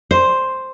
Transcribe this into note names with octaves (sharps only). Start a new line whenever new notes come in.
C5